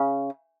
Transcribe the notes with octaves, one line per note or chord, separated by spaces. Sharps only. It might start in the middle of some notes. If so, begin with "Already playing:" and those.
Already playing: C#3